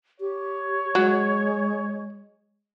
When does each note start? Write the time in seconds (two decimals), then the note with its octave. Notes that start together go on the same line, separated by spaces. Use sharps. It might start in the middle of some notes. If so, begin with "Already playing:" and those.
0.20 G4 C#5
0.95 F#3 G#3